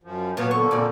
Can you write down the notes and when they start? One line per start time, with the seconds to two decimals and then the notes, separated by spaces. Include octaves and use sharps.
0.03 F#2 F3
0.37 A#2 F#3 B3 B4 C#5 F5 A5
0.51 D3 F3 A#3 A4 C#6
0.71 F2 A#2 D5